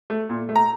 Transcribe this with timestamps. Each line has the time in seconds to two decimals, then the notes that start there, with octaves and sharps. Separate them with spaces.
0.10 A3
0.29 A#2
0.49 A3
0.55 A#5